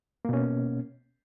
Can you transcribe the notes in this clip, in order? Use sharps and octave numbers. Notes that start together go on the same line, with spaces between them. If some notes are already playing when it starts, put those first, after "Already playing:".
B2 A#3 C#4